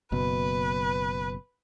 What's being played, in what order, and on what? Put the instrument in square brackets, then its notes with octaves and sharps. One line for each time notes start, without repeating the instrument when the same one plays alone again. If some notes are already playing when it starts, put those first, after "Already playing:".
[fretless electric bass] F#1 B2 [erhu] B4